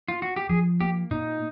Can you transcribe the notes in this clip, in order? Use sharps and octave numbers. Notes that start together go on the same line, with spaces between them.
F4
F#4
G4
F3 G#4
A#3 G4
A#2 D#4